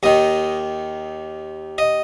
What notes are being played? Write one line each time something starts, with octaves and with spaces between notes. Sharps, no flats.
D#2 D#3 D#5
D#5